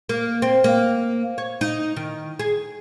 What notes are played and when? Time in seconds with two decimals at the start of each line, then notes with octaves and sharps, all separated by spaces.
0.09 A#3
0.42 C4
0.64 A#3
1.38 C#5
1.61 D#4
1.97 D#3
2.39 G#4